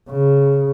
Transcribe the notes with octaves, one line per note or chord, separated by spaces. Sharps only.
C#3